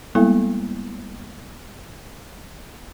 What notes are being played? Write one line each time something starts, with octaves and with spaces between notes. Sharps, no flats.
G3 G#3 A#3 B3 E4 A4